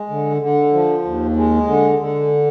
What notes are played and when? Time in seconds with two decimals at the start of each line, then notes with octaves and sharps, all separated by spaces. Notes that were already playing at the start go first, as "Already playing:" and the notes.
Already playing: G#3
0.10 D3
0.41 D3
0.73 F3
1.05 D#2
1.36 G#3
1.68 D3
1.99 D3